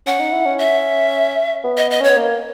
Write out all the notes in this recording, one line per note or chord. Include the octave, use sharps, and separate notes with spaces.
C#4 F#5
D#4
E4
C#4
E5
B3
D#5
D#5
C#4
C#5
B3
A#3